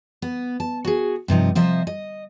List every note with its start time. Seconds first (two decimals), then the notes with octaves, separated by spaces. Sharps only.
0.22 B3
0.60 A5
0.85 F#4 G#4
1.28 G2 C3 F3 D#4
1.55 C3 F3 C5 D#5 E5
1.87 D#5